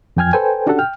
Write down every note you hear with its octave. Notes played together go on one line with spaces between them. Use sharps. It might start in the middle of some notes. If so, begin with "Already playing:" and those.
F2 F3 G5 G#5 F6 G#6
A4 B4 C5 G5 G#5
C#4 D4 F#4 G4 A4 F#5
G5 F6